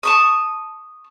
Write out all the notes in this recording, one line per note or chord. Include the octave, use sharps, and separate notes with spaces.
A5 C#6 D#6